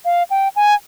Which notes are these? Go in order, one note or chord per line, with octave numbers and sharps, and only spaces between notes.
F5
G5
G#5